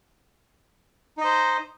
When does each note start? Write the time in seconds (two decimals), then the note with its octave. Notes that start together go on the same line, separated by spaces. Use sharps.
1.18 D#4
1.21 D#5
1.24 C5